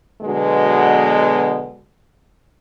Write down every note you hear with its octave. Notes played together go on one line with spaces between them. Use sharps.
B2 D3 F#3 G#3 B3